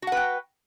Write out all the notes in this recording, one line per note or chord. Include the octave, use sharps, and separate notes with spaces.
F#4 B4 F#5 G5